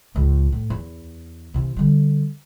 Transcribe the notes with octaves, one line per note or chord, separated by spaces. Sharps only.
C#2 G#2
A2
E2
C3 E3
D3 G3